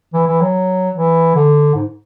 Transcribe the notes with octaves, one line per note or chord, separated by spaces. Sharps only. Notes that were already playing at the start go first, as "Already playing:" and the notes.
E3
E3
F#3
E3
D3
G#2